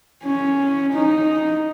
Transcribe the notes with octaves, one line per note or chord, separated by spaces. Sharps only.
C#4
D#4